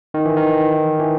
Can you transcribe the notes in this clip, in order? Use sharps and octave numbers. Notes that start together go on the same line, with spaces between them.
D#3
E3
D#3
E3